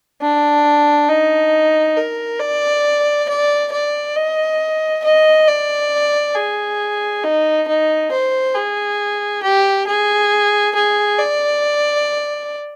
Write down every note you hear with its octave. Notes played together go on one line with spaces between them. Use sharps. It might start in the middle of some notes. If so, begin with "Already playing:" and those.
D4
D#4
A#4
D5
D5
D5
D#5
D#5
D5
G#4
D#4
D#4
C5
G#4
G4
G#4
G#4
D5